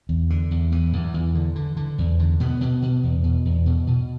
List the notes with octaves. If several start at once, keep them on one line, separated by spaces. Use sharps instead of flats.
E2
D3
E2
E2 E3
E2
E2
D3
D3
D3
E2
D3
B2 B3
B2
B2
E2
B2
E2
B2
B2